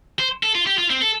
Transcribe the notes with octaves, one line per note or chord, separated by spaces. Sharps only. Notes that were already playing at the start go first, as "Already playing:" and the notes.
C5
A4
F4
G4
F4
C4
A4